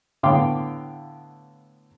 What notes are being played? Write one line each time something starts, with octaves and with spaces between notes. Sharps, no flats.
A2 D3 B3 F5 G5 D6